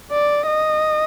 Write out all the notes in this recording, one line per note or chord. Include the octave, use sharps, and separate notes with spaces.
D5
D#5